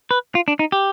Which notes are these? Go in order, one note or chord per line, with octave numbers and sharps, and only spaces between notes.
B4
F4
D4
D#4
G4